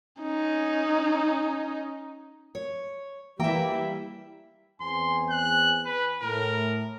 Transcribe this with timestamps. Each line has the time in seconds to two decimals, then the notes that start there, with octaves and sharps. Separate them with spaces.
0.22 C#4 D#4
2.55 C#5
3.40 E3 G3 A#3 E4 E5 G5
4.81 E2 C4 G#5 C6
5.30 F#6
5.85 B4
6.22 A2 A#4